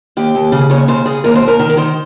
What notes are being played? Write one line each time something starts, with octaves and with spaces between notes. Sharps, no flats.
D#2 G4
D#2
C#3
D#2 C#5
C#3 C5
C#3 G#4
D#2 A#4
C5
D#2
A#4
D#3
A#4
D#3 C5